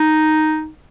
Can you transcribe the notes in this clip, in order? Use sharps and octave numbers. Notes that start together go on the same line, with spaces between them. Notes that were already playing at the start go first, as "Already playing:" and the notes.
Already playing: D#4